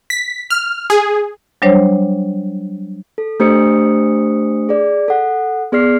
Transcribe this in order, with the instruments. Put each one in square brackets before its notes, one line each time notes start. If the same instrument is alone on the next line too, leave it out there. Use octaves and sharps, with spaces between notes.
[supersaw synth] B6
F6
G#4
[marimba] F#3 G3 D4 C5 C#5
[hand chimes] A4
A3 D4 G4 C5 D#6 C#7
G#4 D5
A4 F#5
B3 G#4 D5 F6 C7